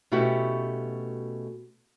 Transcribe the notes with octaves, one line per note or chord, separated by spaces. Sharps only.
B2 A3 C#4 E4 F#4 G4